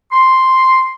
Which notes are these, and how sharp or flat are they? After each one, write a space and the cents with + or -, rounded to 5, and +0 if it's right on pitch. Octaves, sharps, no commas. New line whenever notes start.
C6 +0